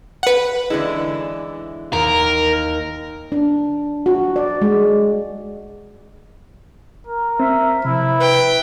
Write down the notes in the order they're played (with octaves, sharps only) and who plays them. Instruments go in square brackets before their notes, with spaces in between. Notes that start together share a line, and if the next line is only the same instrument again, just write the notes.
[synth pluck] B4 F#5
[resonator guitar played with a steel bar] D3 E3 G#3 [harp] E4
[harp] D#2 [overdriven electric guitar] A#4
[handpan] D4
F#4
D5
G#3
[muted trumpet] A#4
[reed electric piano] C4 [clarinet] E5
[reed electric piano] C3 [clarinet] F3 [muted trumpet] E4
[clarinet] B4 [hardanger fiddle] G5